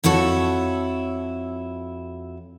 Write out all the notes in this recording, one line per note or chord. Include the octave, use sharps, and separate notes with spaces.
F2 E4 F#4 A4 C#5